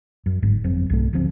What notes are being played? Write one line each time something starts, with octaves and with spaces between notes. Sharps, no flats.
F#2
G1 G#2
G1 F2 F#3 C4
B1 G2 A3
D1 D2 F3 C4